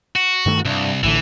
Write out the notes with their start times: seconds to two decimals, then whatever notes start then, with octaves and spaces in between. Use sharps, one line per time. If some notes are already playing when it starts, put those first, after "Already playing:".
0.16 F#4
0.46 G2 D#3 A3
0.65 C2 G2
1.03 A1 A2 D3 E3